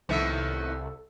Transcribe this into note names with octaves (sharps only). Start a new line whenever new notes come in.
C2 A2 D#3 F3 B3 A4 E5 E6